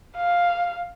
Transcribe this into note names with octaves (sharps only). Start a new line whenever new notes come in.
F5